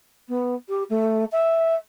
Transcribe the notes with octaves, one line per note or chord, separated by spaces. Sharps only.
B3
G4
A3
E5